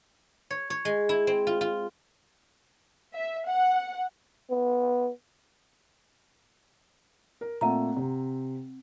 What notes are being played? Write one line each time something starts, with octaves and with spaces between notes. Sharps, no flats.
C#5
C#5
G#3
E4
C4
F4
F4
E5
F#5
B3
A#4
A#2 A3 C4 E5 F#5 A#5
C3